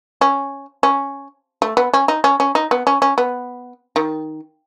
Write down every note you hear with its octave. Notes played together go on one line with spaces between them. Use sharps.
C#4
C#4
A3
B3
C#4
D#4
C#4
C#4
D#4
B3
C#4
C#4
B3
D#3